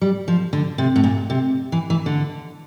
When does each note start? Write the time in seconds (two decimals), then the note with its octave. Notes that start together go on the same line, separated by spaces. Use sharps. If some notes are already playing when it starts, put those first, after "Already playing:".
0.01 G3
0.28 F3
0.53 D3
0.78 C3
0.96 A2
1.04 A#2
1.30 C3
1.72 E3
1.90 E3
2.06 D3